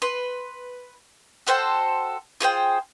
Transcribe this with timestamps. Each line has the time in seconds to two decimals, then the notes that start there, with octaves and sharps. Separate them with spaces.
0.02 B4 C6
1.47 F#4 A4 C5 G5
2.41 F4 G#4 C5 G5